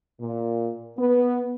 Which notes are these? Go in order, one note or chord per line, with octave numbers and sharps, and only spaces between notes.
A#2
B3